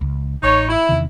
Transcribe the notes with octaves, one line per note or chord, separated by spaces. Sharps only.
C#2
A1 D#4 C#5
E4
E2 C3 D#3